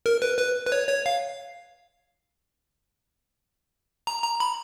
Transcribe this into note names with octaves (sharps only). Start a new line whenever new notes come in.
A#4
B4
B4
B4
C#5
C#5
F5
A#5
A#5
B5